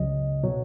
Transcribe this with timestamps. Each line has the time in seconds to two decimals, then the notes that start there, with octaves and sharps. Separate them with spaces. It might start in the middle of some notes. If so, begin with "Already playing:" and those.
Already playing: C#2 C#3 F#3 D#5
0.43 B2 F#3